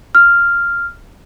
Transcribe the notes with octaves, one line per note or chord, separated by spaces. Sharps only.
F6